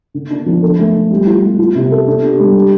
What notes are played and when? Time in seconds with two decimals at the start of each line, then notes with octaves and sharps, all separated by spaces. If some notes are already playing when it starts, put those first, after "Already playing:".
0.14 D3
0.30 D4
0.46 F3
0.62 A4
0.78 A3
0.94 A3
1.11 G3
1.26 F4
1.43 G3
1.59 F4
1.75 C3
1.91 A4
2.07 D4
2.23 G4
2.40 G3
2.55 G4